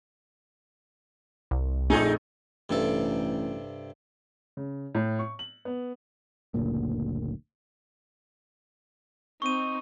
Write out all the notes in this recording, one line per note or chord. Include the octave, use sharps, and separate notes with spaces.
C2
A#1 F2 A3 D#4 G#4
A1 G2 C3 A4
C#3
A2
C#6
F#7
B3
F#1 D2 A#2 A#3
C4 D#4 C#6 D#7